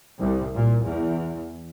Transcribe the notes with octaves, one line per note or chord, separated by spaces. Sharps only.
C2
A#2
E2